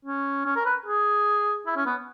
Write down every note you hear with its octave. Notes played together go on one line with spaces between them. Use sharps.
C#4
C#4
A#4
B4
G#4
E4
C#4
B3